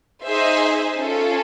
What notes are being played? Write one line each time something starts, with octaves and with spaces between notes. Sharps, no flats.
D#4 G#4 C5 E5
C#4 F4 A4